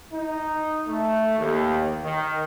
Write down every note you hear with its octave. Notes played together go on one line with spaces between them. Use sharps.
D#4
A3
D#2
D#3